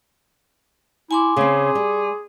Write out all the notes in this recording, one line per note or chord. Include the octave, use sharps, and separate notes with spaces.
E4 G#5 C6 D6
C#3 C4 G#4
G3